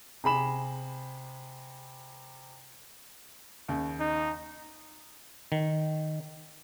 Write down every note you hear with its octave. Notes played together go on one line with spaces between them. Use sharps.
C3 G#4 B5 E7
D#2 C#3
D#4
D#3